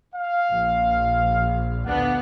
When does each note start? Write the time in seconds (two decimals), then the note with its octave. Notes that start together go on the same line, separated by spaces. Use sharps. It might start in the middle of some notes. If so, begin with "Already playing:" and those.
0.14 F5
0.50 A#1
1.86 D2 B3 D4 F#5